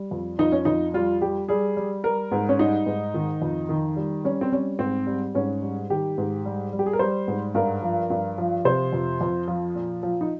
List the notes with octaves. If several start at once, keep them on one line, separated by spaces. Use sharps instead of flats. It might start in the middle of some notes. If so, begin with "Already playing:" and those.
Already playing: G3
F2
F2 D#4
C#4
F2 D#4
G3 F4
G3 G4
G3 G#4
G3
G3 A#4
G#2
C#4
G3 D#4
G#2
D#3
F2
D#3
G3
G3 C#4
C4
G3 C#4
G#2 C4
G3
G#2 C#4
G3
D#3 G4
G#2
G3
G3
G4
G#4
A#4
G3 C5
G#2
G2 A#4
F3
G2
F3
C3 C5
F2
F2
F3
A#2
F3
D#4